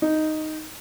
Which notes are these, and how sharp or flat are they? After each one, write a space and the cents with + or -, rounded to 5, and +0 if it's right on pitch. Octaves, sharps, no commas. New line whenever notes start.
D#4 +0